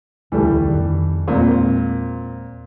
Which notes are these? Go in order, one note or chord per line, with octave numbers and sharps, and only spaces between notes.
D#1 C#2 D3 E3 G3 A3
F2 D#3
E2 A#2 G#3 C4